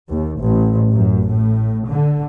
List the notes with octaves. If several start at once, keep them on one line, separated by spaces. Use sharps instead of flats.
D#2
A1
F#2
A2
D3